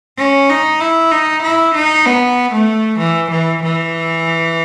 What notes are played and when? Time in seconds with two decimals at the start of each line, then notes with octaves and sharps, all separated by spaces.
0.18 C#4
0.50 D#4
0.80 E4
1.12 D#4
1.43 E4
1.75 D#4
2.06 B3
2.53 A3
3.00 E3
3.31 E3
3.63 E3